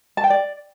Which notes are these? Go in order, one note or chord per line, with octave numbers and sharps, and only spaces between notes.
A5
G5
D5